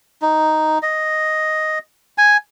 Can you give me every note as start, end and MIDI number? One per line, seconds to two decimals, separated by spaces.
0.22 0.78 63
0.83 1.79 75
2.18 2.37 80